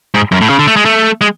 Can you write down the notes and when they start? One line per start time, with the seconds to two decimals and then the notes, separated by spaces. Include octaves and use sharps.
0.14 G#2
0.31 F#2
0.41 A2
0.49 C#3
0.59 D3
0.67 A3
0.76 G#3
0.85 A3
1.21 G#3